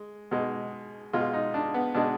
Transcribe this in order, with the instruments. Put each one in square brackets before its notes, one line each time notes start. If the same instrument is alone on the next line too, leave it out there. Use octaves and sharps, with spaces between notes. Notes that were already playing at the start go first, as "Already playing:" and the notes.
Already playing: [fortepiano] G#3
B2 G#3
B2 G#3 F4
D#4
D4
B3
B2 G#3 D4